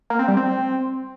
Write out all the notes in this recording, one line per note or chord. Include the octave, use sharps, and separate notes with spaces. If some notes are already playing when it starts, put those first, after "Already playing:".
A#3
C4
G3
C4